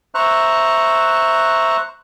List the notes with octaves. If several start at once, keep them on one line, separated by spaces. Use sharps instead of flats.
C5 E5 A#5 C#6 F#6